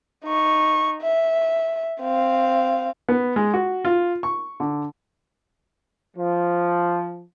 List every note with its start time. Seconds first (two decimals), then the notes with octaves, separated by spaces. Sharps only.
0.25 D#4 C#6
1.01 E5
2.01 C4 F5
3.09 B3
3.36 G#3
3.54 F#4
3.85 F4
4.23 C#6
4.60 D3
6.17 F3